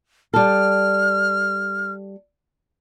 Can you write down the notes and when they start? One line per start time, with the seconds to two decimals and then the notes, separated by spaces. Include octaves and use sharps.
0.34 G3 A4 F6